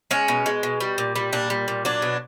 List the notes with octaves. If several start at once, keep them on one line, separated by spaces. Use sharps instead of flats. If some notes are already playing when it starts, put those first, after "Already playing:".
G#3 C#4
B2
G#3
B2
G3
A#2
G3
A#2 D4
G3
A#2
F#3 D4
B2